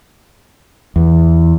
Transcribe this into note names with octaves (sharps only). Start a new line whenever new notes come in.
E2